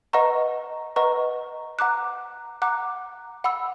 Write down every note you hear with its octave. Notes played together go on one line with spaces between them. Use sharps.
B4 D#5 F#5 A#5 C#6
B4 D#5 F#5 A#5 C#6
F#5 A#5 D6 F#6
F#5 A#5 D6 F#6
F#5 B5 E6